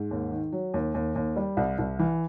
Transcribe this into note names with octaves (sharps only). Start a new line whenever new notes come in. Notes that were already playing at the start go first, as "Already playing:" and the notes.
Already playing: G#2
D#2
D#3
F#3
D#2
D#2
D#2
G3
C2
C2
E3